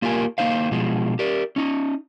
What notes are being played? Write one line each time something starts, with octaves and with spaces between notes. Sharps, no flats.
A#3 F4 G4 A#4 G#5
A#3 D#4 C5 F5
B2 F3 G#3
G4 A#4 D5
C#4 D#4